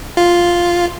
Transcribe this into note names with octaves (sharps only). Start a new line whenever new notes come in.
F4